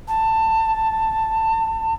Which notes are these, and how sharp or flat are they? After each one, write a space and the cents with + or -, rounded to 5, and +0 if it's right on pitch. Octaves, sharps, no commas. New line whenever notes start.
A5 +20